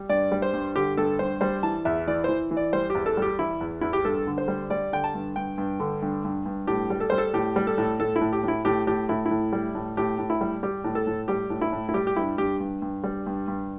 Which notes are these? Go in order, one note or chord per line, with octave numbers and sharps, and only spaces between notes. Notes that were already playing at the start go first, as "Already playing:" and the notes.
Already playing: G3
G2 D5
G3
C5
G2
D3 G4
G2 A4
G2 C5
G3 C5
E3 A5
E2 E5
E3 D5
E3 C5
E3
D5
G3 C5
G4
E2
A4
G3 G4
E3 E4
E2
E2 E4
G4
G2 A4
D3
C5
G3
G3 D5
D3 G5
A5
G2
G2 G5
G2
D3
G2
G2
G2
A2 G4
G3
A4
G3 C5
A4
A2 G4
G3
A4
A2
A2 A4
E4
A2
G4
A2 E4
A2 G4
A2 G4
A2 E4
E4
A2
G3
A2
A2 G4
A2
E4
G3
G3 G4
A2
A4
A2
G3 G4
A2
E4
A2
E4
G3 G4
G4
G2 E4
G2 G4
G2
G2
G3
G2
G2